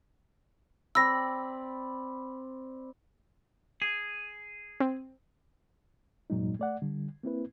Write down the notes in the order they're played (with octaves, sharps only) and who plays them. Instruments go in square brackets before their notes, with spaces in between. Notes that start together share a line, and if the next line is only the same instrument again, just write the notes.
[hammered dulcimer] C4 D5 B5 [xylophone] E6 A#6
[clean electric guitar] G#4
[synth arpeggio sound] C4
[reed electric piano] E2 G2 A#2 F#3 G#3 D#4
A3 D5 F#5
D3 G3
A#3 C4 E4 B4